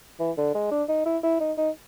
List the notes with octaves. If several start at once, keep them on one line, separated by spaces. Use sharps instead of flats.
E3
D3
G#3
D4
D#4
E4
E4
D#4
D#4